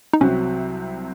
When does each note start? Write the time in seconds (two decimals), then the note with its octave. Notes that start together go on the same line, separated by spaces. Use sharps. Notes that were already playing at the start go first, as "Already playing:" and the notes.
0.13 D#4
0.20 C2 C3 F#3 C4 C#4 F#4